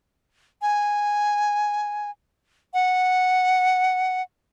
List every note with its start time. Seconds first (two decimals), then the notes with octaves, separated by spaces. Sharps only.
0.62 G#5
2.74 F#5